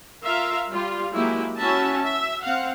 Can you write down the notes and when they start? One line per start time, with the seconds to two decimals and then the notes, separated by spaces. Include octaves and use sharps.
0.24 F4 A#4 E5 F5
0.71 G3 F4
1.13 F#3 G#3 A#3 E4 G4
1.57 C#4 E4 F#4 E5 A5
2.02 E5
2.43 C4 F5 F#5